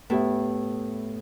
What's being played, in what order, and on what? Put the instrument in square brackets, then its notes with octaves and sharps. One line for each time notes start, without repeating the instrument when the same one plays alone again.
[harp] A2 [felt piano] B3 G4 E5